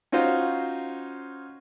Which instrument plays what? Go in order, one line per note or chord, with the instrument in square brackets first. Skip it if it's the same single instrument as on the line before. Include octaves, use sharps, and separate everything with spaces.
[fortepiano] C#4 D#4 F4 F#4 C5